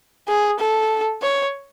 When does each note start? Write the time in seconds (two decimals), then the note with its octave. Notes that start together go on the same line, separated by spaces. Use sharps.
0.28 G#4
0.60 A4
1.22 C#5